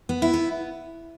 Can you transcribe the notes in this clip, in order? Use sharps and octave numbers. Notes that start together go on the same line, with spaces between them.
B3
E4
B3